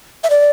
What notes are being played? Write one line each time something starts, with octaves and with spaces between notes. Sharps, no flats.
E5
D5